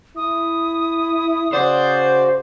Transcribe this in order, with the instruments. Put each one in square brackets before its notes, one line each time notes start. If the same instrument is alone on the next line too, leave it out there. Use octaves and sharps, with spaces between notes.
[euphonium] E4 [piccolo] D#6
[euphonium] C#3 [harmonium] F#4 D5 [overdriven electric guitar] C5